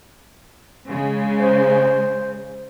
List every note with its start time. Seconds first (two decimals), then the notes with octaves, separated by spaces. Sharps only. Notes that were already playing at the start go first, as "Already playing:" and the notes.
0.88 C#3 G#3
1.40 C5